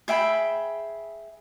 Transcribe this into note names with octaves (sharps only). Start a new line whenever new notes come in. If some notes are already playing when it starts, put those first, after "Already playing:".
G#4 E5 G5 B5